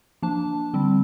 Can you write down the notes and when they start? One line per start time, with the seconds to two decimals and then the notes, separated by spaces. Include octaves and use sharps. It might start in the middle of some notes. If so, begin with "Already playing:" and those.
0.22 F3 A#3 D4 A5
0.73 D3 G3 C4